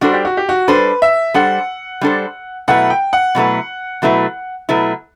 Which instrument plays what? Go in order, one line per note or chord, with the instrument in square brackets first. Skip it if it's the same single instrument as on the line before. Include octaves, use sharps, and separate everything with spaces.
[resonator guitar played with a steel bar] G3 D4 A4 C5 [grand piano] F#4
[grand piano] G4
F#4
G4
F#4
[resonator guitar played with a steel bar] G3 D4 A4 C5 [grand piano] B4
[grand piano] E5
[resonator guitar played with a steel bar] G3 D4 A4 C5 [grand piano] F#5
[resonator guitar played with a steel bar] G3 D4 A4 C5
[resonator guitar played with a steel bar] B2 F#3 A3 E4 B4 [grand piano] F#5
[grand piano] G5
F#5
[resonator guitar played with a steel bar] B2 F#3 A3 E4 B4
B2 F#3 A3 E4 B4
B2 F#3 A3 E4 B4